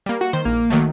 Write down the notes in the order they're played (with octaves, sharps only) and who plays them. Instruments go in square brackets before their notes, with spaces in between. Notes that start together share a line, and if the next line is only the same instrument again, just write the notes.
[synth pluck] G3 A#3
[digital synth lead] F#4
[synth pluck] D#3 [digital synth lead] C5
[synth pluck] A#1 [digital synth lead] A#3
[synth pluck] D#3 F#3 A3